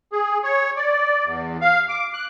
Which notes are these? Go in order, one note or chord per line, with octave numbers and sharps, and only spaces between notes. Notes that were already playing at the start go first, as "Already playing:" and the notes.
G#4
C#5
D5
E2
F5
D6
F#6